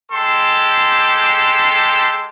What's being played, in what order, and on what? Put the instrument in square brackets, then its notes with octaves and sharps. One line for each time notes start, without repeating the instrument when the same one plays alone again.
[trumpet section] G#3 G4 A4 C6